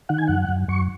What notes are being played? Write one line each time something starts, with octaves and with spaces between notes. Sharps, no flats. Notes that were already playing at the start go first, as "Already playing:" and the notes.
D#3 F#5
G#5
F#2 F#5
F#2
F#2 C#6